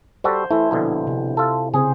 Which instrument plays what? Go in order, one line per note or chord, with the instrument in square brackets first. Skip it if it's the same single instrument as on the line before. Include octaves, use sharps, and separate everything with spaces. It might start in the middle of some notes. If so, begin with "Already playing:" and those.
[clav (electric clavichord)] G3 F#4 A4 [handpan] C5
[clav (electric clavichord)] E3 A3 [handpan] E4
[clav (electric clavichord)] A#1 B2 D3
[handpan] C3
[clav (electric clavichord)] F4 A4
[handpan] C#3 C4 C5 [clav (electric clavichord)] G#4